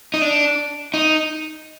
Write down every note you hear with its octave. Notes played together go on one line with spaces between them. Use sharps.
D#4
D4
D#4